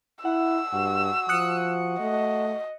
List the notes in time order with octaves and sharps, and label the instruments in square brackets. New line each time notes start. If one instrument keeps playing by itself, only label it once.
[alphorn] E4 [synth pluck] F#5 [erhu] E6
[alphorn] G2 [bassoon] F#4
[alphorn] F3 [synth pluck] D#6 F#6 C#7
[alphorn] A3 [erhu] D#5